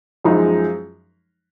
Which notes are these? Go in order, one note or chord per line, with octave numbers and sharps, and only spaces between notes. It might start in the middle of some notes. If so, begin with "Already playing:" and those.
F#2 F3 G#3 D#4